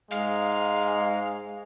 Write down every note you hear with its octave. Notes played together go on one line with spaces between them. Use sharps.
G#2 G#3 F5